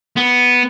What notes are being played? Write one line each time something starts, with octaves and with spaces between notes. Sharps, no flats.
B3